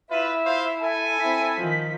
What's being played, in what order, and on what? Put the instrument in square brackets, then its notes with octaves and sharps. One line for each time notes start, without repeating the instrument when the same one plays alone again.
[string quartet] E4 [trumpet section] F4 B4 [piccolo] E5
[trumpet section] F4 C5 F5
A4 G#5
[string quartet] C4 E4 [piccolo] B6
[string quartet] D#3 F3